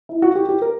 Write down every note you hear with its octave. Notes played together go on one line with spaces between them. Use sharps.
E4
F#4
G4
G4
A#4